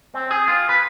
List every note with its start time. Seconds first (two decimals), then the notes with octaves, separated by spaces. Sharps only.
0.14 C4
0.31 G#4
0.48 F4
0.69 B4